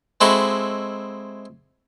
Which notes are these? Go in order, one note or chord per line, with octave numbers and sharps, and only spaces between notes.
G#3 C4 E4 F#4 A4 D#5